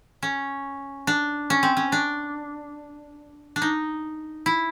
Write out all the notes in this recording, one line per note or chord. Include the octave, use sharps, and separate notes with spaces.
C#4
D4
C#4
C4
C#4
D4
D4
D#4
E4